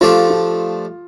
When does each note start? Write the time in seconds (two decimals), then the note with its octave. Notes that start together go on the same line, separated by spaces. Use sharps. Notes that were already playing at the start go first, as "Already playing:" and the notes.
0.01 F3 A3 D4 F4 G4
0.30 F4